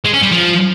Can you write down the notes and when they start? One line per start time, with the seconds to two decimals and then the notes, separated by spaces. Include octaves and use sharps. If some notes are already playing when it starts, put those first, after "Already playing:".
0.05 G#3
0.13 C#4
0.22 G3
0.31 F3